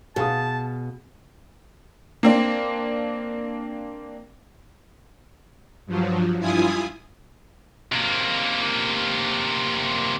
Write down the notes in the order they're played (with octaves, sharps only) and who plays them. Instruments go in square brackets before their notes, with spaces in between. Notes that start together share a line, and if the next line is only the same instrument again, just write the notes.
[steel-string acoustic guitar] B2 [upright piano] G#4 F5 D#6 [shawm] A5
[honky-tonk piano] A#3 C4 D4
[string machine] G2 F3 F#3
G2 E4 F4 G#5 D#6
[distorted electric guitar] C3 A#3